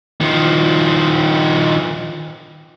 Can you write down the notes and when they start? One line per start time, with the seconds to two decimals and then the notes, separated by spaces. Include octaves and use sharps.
0.21 D#3 F3